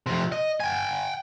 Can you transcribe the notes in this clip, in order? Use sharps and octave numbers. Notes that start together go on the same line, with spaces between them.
F2 C3
D#5
G5 G#5